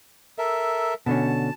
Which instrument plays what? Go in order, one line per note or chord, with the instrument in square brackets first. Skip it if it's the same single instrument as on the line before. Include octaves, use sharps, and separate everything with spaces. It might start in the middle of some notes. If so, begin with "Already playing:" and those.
[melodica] A4 A#4 E5
[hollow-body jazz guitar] B2 D3 C#4 [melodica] A5